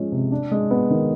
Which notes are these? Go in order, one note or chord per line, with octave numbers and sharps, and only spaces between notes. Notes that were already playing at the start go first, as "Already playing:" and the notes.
Already playing: F3 G#3 C#4
C3
D4
G#3
B3
D#3